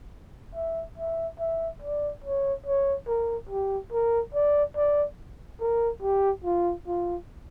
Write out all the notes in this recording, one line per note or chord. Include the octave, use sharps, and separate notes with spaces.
E5
E5
E5
D5
C#5
C#5
A#4
G4
A#4
D5
D5
A#4
G4
F4
F4